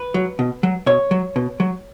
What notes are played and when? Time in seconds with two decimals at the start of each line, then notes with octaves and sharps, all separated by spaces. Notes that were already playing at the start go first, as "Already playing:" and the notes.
Already playing: B4
0.14 F#3
0.39 B2
0.63 F#3
0.86 B2 C#5
1.11 F#3
1.36 B2
1.60 F#3